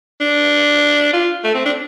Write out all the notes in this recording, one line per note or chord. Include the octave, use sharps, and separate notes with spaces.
D4
F4
A3
C4
D4